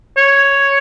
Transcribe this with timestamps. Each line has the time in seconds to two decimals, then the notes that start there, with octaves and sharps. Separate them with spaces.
0.17 C#5